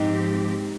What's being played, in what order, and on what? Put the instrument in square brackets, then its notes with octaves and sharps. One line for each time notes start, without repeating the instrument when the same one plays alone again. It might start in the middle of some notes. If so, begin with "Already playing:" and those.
Already playing: [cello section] G#2 F3 C4 G4 [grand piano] D#4